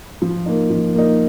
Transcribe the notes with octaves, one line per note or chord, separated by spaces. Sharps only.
F3
A#3 D#4
F3
A#3 D#4